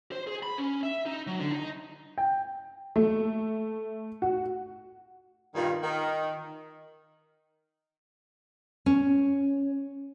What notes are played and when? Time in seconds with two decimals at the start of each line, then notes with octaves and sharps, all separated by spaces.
0.12 C5
0.27 G#4
0.43 B5
0.58 C#4
0.83 E5
1.06 D#4
1.27 F#3
1.39 D3
1.52 D#4
2.18 G5
2.96 A3
4.22 F#4
5.55 G2 A#2 D#3
5.82 D#3
8.86 C#4